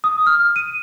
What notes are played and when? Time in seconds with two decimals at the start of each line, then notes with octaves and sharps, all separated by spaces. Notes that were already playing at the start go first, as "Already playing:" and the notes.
0.04 D#6
0.26 F6
0.56 D#7